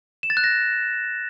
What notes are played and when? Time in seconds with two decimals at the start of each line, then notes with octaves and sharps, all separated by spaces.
0.23 E7
0.30 A6
0.37 F#6
0.44 A#6